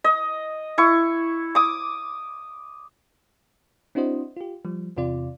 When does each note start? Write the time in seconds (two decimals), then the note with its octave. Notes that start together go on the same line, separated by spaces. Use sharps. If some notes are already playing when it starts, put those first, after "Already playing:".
0.04 D#5
0.78 E4 C#6
1.55 D6 D#6
3.95 C4 D4 E4 F#4 C5 D#5
4.37 F4 G4
4.65 F3 G3
4.97 E2 C3 F4 D5